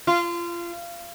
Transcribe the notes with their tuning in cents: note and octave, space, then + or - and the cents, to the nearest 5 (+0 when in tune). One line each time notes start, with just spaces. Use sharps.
F4 -25